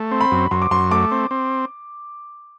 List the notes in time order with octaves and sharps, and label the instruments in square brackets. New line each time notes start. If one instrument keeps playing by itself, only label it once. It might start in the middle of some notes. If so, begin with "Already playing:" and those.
Already playing: [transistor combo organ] A3
C4
[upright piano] B5
[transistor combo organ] F#2
[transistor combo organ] F#2 [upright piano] C6
[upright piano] D6
[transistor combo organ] F#2 [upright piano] C6
[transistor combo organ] A3 [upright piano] D6
[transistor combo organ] C4
C4